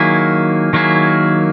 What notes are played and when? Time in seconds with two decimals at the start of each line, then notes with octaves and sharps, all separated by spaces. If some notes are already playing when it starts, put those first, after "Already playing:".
Already playing: D#3 F#3 A#3 E4 G#4
0.73 D#3 F#3 A#3 E4 G#4